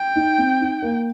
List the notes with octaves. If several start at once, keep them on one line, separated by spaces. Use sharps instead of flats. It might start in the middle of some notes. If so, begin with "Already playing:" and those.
Already playing: G5
D#4
C4
D#4
A#3